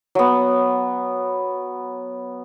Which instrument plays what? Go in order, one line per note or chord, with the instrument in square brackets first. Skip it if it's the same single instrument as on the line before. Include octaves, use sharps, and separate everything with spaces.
[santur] F#3 B3